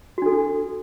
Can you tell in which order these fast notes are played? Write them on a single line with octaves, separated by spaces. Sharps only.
F#4 D4 A4